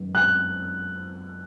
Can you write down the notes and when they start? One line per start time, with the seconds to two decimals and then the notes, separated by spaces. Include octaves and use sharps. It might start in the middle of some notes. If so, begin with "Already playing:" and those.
Already playing: F#2 D#3 G#3 B3
0.15 F#6